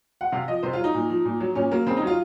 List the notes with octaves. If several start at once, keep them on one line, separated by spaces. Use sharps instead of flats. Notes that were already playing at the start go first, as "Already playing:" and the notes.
F#5
C3 F5
F3 D#5
C3 C5
F4
F#3
D#4
A#2
F3
A#2
F#3
A#2 C#4
F#3 A#3
C#3 C4
D#4
F#3
F4